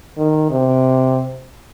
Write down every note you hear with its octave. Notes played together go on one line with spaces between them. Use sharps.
D#3
C3